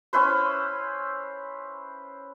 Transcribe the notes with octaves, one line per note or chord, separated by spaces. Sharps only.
C#4 E4 B4 C5